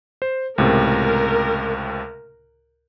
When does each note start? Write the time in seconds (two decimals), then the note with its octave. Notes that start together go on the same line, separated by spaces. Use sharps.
0.22 C5
0.58 C#2 A2 C3 A#4